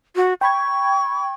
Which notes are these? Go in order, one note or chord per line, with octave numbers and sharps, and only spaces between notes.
F#4
G5 B5 C#6 G#6